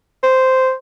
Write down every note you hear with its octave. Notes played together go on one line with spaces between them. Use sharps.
C5